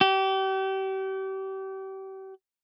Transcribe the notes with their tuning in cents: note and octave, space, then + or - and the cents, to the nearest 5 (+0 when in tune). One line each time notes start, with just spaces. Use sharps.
G4 -35